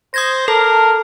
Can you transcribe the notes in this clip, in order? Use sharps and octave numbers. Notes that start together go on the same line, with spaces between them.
C5 D#6 G#6 A#6
A4 A#4 A5